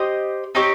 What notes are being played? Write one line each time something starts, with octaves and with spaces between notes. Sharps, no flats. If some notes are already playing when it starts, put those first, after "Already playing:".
Already playing: G4 C5 D#5
C4 D#4 G4 C#5